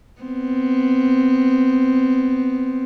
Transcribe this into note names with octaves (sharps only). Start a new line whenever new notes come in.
B3 C4